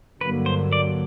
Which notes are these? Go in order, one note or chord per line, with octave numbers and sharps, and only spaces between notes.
G2 D3 F#3 A#3 B4
C5
D5